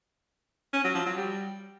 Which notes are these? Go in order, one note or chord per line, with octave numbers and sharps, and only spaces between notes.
C#4
F#3
F3
F#3
G3